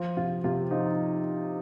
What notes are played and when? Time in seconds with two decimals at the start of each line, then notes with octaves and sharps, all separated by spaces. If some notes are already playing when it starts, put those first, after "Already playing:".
Already playing: F3
0.17 C3 F4
0.44 C3 F4
0.71 F3 D#4